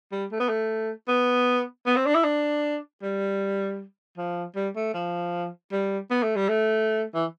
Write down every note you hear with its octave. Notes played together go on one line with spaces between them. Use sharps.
G3
A3
B3
A3
B3
B3
C4
D4
E4
D4
G3
F3
G3
A3
F3
G3
B3
A3
G3
A3
E3